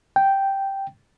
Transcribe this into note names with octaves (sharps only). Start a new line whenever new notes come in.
G5